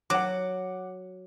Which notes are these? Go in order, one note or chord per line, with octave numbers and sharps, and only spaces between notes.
F#3 F#5 D6